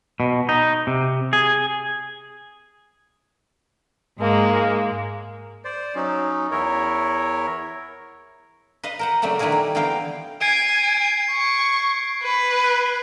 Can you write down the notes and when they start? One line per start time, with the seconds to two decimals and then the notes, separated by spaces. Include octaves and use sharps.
0.20 B2
0.49 D#4
0.87 C3
1.33 G#4
4.19 G#2 G#3 A#3
5.65 C5 D5
5.95 F#3 C#4 D#4
6.51 E2 E4 A#4 C#5
8.84 B4 D#5 F5
8.99 A#4 C5 F#5
9.22 C#3 F#3 G3 A3 A#3 C4
9.39 D#3 A3 D4 E4 G#4 A#4
9.52 G3
9.75 D3 E3 B3 A#4 F5 G5
10.41 G#5 G#6 C7 D7
10.97 G#6
11.31 C#6
12.23 B4
12.64 F#6